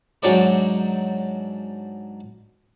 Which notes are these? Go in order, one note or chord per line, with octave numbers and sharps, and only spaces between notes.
G#2 F#3 D4 C#5 G5 D6